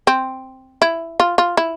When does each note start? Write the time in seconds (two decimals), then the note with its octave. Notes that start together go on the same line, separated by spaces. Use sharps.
0.07 C4
0.82 E4
1.20 F4
1.38 F4
1.57 E4